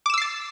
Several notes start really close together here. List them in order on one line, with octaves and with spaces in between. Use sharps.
D6 E7 E6 C7 A6